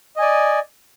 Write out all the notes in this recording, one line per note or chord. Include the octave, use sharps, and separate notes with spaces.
D5 D#5 G#5